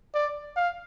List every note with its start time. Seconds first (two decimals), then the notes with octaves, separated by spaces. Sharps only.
0.14 D5
0.57 F5